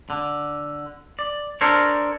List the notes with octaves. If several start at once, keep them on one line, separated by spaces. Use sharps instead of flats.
D3
D5
D4 A4 A#4 C5 C#5